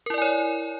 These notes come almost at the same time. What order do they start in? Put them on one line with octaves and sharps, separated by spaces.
A#4 E4 D5 G#5 C#5